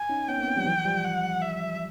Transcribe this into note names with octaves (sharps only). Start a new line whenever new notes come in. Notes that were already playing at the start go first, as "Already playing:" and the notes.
Already playing: G#5
C#4 D#4
B3 C#4 G5
A#3 C4
B3 C#4
F3 G3
E3 F#3
F3 G3
F#5
E5